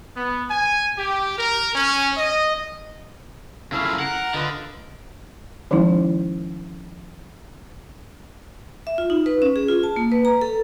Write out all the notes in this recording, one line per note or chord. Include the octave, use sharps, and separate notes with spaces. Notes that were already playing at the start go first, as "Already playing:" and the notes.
B3
G#5
G4
A#4
C#4
D#5
C#3 E4 A4 C#5 F5
F4 A4 A#4
A#4 F#5 A#5
D3 F4 B4 D#5
D#3 F3 G#3 C#4 D#4 E4
E5
F4
D#4
B4
C#4
G#4
F4
A5
A#3
B4
A#5
A4